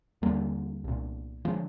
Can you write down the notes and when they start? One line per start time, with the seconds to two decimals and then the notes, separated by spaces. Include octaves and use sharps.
0.22 D#2 D3 G3 A#3
0.84 C2 A#2
1.45 D3 F3 G#3